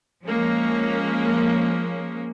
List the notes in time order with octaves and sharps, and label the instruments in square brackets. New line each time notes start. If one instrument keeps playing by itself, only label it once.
[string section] F3 G#3 A#3 C#4